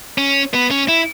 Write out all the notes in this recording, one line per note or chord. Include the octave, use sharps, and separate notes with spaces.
C#4
B3
C#4
E4